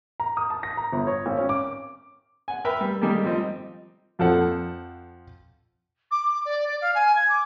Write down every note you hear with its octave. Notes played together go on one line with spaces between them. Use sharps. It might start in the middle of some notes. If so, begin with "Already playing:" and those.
A#5
D#6
A5
A#6
A#5
G1
C#5
G#1
C#4
D6
F#5 G#5
A#4 B4 E5 G5 B5
G3
D#3 G3 G#3 A#3 G4 A4
F3 G3 C4 D#5
F2 F3 A4 F#5
D6
D6
D5
D5
F5
G#5
G#6
D6